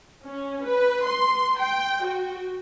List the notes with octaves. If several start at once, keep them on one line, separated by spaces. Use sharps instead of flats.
C#4
B4
C6
G5
F#4